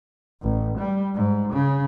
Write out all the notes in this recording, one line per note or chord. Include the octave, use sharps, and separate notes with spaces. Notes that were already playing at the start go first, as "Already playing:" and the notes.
A1
G3
G#2
C#3